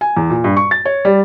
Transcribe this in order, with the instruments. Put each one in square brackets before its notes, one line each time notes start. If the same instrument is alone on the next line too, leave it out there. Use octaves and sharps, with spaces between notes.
[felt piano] G#5
E2
A#2
G2
C#6
A6
C#5
G3